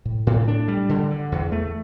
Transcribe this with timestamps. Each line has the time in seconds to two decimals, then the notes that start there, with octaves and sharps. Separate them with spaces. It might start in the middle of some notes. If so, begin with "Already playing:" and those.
0.05 A2
0.27 A2
0.48 D4
0.68 G3
0.89 D3
1.10 D3
1.32 E2
1.52 A3